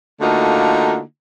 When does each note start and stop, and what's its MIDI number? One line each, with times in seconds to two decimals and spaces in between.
0.21 1.00 50
0.21 1.00 57
0.21 1.00 58
0.21 1.00 63
0.21 1.00 65
0.21 1.00 66